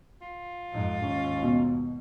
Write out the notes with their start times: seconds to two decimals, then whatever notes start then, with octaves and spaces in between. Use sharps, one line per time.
0.22 F4
0.72 F2 G#2
1.02 D#2 G#2 C#4
1.42 B2